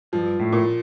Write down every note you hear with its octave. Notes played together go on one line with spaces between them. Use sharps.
G2 F3
A2
A#2